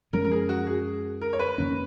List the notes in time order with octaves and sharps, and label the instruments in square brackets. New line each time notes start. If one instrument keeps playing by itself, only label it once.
[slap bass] F#2 F3 G#3 C#4 [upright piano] A#4
[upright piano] A#4
G#4
F#4
G#4
A#4
C#5
B4
[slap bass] F2 D#3 A#3 C#4